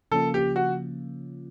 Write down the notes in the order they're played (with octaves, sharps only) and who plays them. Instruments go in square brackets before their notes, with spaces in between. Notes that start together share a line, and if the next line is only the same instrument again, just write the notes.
[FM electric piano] C#3 F3 A#3 C#4 F4 [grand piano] A4
[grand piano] G4
F#4